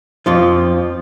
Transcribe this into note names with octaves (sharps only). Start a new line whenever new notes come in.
F2 F3 F4